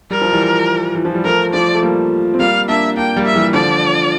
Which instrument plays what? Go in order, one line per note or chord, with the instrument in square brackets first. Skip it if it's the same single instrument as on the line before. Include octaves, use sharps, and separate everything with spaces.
[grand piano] G3 [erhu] A#4
[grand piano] F3
E3 G3
E3
F3
G3
[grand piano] F3 A3 [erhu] A#4
[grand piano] F3 A3 [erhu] D5
[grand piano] A3
G3 A#3
C4
[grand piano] G3 A#3 [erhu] F5
[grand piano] A#3 D4 [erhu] E5
[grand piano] A#3 D4 [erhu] G5
[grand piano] G3 A#3
[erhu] E5
[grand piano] E3 G3
[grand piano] D3 F3 [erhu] D5